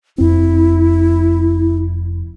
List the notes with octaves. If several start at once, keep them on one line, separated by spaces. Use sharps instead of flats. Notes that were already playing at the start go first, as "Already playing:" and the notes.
F1 F2 C4 E4